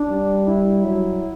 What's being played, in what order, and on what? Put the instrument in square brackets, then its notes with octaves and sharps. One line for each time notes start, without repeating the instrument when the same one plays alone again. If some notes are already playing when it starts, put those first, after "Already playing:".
Already playing: [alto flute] D4
[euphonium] G3
[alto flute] E4
[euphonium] F#3